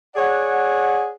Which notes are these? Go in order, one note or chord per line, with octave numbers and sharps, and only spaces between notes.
G#4 C#5 D5 F#5